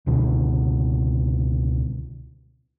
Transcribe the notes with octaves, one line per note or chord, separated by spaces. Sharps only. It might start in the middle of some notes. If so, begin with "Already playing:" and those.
C#2 B2 D3